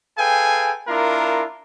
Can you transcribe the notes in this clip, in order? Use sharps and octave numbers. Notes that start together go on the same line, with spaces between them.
G#4 A4 B4 F5 G5 G#5
A#3 D4 E4 F4 A#4